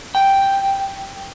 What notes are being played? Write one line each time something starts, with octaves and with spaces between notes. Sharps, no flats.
G5